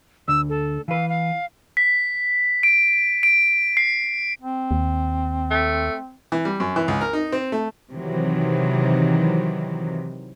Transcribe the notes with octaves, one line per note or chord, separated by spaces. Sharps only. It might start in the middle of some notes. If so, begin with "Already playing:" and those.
D2 D3 E6
A4
E3 B4 F5
F5
B6
D7
D7
C7
C4
D#2
A3
E3
G3
F#2
E3
C#2
A#4
D#4
C4
A3
C3 D#3 E3 F#3